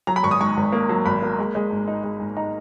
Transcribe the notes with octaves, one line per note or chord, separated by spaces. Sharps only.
F#3 A#5
B5
G#1 C#6
D#6
G#2 C#6
G#1
A#3
F#3
G#1 B5
A#3
G#3
G#3
G#2
D#4
G#3
G#2
D#4 A#5